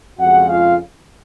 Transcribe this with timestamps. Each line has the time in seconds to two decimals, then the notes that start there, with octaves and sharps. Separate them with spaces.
0.19 F2 C#3 G#3 F#4 F#5
0.49 F4 F5